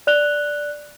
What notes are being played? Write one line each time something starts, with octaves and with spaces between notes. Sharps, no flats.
D5 F#6 F7 G7